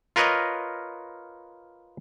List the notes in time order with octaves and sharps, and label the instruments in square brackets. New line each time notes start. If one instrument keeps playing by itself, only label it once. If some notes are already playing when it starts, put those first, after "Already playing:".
[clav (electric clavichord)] F4 A#4 B4 C#5 D#5